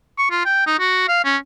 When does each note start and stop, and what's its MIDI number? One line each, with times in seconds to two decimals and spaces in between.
0.18 0.28 85
0.31 0.41 65
0.45 0.63 79
0.67 0.77 63
0.79 1.03 66
1.08 1.22 77
1.24 1.37 61